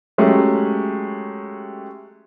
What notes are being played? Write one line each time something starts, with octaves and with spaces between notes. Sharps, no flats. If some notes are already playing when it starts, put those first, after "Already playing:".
F#3 G#3 A3 C#4 G4